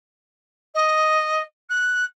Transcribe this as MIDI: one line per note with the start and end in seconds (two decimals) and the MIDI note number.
0.74 1.41 75
1.69 2.04 90